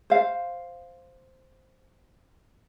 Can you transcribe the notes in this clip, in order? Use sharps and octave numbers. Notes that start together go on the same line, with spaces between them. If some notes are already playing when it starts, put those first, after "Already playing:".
C5 F5